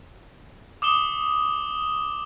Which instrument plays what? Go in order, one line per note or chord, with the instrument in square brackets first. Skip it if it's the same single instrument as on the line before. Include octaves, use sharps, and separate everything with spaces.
[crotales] D6 D#6 E7 G7